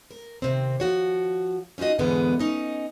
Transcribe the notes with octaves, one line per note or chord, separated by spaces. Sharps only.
A#4
D#2 C3 C4
F3 F#4 C#5
C#4 D#4 F4 F#4 D#5
E2 G#2 D3 G#3 B3 E4
C#4 D#4 D#5